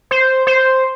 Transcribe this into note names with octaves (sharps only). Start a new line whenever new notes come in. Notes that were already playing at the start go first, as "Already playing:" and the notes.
C5
C5